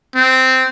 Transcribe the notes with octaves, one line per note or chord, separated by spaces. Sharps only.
C4